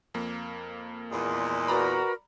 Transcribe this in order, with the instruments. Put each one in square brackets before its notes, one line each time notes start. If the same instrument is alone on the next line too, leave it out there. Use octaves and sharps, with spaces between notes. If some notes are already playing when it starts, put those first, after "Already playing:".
[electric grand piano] F2 A#3
[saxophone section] E2 A#2 [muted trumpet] G#3
[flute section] F#4 A#4 B4 [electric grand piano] D5 A#5 B5